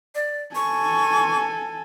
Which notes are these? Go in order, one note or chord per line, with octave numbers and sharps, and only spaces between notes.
D5
A4 G#5 C#6